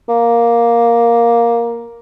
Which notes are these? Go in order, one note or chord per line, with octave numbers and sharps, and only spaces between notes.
A#3